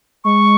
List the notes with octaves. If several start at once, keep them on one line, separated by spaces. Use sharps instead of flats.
G#3 C#6